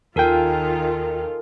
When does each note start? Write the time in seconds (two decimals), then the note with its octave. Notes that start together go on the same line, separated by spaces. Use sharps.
0.16 D#2 D#3 F4 A4 A#4 G5 G#5